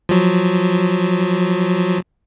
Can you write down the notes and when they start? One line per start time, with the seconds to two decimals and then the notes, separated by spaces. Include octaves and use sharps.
0.09 F3 F#3